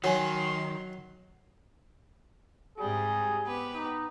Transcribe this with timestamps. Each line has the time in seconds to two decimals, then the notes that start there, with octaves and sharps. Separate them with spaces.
0.04 D#3 F#3 C#5 G#5 C6
2.78 G#2 C3 G3 G#4
3.46 B3 G4 B4
3.74 D#4